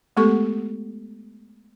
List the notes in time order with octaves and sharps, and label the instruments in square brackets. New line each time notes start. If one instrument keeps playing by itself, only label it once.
[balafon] G#3 A3 B3 G4 A4 C#6